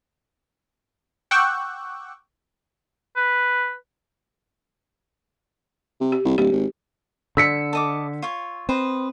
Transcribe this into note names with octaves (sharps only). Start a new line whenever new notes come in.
F#5 G5 C#6 D6 E6 F#6
B4
C3
G4
C2
D1 G4
G#1
D3 E6 B6 C#7
A4 D#5 D6
F4 C#5
C4 B4 C5 D#5